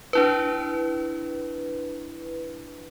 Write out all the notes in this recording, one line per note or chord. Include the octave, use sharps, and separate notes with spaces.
D4 E4 B4